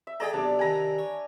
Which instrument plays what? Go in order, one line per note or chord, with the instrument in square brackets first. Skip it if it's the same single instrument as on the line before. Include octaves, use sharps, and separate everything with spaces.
[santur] E5
[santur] G#4 D5 A#5 [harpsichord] A4 D#5 G5
[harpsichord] B1 C3 [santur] D4 A5
[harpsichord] C3 D#3 [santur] G#5 A#5
[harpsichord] C#5